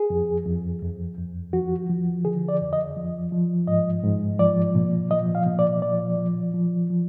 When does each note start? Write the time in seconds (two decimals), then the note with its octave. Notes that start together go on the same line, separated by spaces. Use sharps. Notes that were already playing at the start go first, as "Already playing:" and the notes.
Already playing: G#4
0.10 F2
0.46 F2
0.82 F2
1.17 F2
1.53 F3 F#4
1.89 F3
2.25 D3 G#4
2.48 D5
2.61 F2
2.73 D#5
2.96 F3
3.32 F3
3.67 G#2 D#5
4.03 G#2
4.39 F3 D5
4.75 A#2
5.11 F3 D#5
5.35 F5
5.46 A#2
5.59 D5
5.82 F3 D5
6.18 F3
6.54 F3
6.90 F3